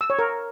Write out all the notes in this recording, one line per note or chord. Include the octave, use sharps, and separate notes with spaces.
E6
C#5
A#4